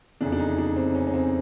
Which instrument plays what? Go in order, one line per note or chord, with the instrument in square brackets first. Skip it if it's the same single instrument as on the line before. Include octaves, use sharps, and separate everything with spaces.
[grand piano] F1 E2 C#3 D4
D4
D#4
D4
C4
C#4
C#4
C4